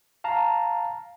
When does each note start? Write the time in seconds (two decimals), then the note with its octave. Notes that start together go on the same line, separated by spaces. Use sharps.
0.24 F5 A5 A#5